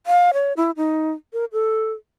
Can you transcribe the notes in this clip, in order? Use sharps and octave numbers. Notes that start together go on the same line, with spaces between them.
F5
C#5
E4
D#4
A#4
A4